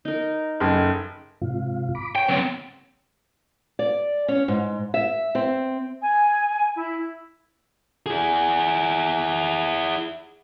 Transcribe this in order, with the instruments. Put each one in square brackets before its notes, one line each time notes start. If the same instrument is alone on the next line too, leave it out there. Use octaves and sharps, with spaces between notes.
[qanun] D#4 A#4
[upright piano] F#1 [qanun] D#4 G#4 A4
[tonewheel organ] G#2 C3 F4
B5 D6
[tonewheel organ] C#5 [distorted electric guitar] G5
[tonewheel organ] C#3 B3 [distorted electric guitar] F#3 C4
[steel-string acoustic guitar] D5
C#4
G#2
E5
C4
[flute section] G#5
E4
[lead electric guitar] E4 G#4